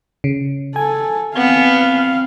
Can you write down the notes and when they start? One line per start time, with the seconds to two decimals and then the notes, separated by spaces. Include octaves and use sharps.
0.24 C#3
0.76 A4 G#5
1.36 B3 C4 F5